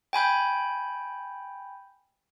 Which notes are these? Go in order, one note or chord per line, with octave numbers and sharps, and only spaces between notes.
G5 G#5 B5 G6